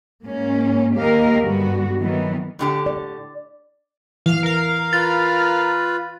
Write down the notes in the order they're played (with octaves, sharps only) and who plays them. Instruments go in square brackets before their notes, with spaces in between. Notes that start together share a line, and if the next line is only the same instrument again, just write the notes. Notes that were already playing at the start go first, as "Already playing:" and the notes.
[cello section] G#2 A#3 C#4
D#2 A#3 G4 A#4 D#5 F5
G2 D3 G3 B3 F#4
D#3 E3 F#3 B3
[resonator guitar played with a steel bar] A2 D3 G4
[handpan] D5
[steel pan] E3 [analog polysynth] F5 F6
[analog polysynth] A#4 F5
[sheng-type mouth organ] F4 B4 [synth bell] A6